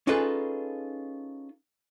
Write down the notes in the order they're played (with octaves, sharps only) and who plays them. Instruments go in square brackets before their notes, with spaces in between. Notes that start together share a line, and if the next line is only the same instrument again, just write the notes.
[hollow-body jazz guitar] C#4 D#4 F4 G#4 A4 B4